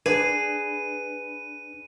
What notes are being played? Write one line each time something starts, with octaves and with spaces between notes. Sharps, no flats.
D4 G#4 B4 D#7